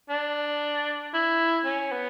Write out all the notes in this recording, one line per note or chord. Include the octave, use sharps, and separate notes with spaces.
D4
E4
C#4
B3